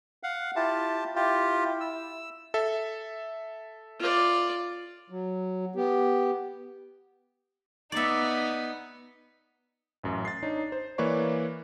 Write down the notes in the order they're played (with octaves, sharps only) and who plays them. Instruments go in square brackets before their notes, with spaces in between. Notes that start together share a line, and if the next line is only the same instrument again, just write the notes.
[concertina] F5 F#5
[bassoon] E4 [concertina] F4 G4 A5
[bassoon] E4 [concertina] F4 G4
[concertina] E6
[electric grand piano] A4 E5
[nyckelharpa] F4 D5
[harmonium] F#3
B3 G4
[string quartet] B3 D#4 [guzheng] D5 E5
[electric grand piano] A1 F#2
A6 C7
D4 D#4 C#5
C5
E3 A#3 B4 C#5 D5 C#6